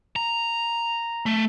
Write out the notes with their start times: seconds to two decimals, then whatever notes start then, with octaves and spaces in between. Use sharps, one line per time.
0.16 A#5
1.26 A3